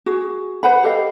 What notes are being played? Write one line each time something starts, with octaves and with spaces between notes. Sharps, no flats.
F#4 G#4
B4 C5 F#5 B5
G4 A4 D#5 F5